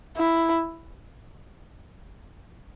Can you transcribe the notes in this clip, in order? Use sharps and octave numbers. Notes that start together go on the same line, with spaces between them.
E4